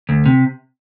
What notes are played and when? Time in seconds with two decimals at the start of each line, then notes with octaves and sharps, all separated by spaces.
0.09 D2
0.26 C3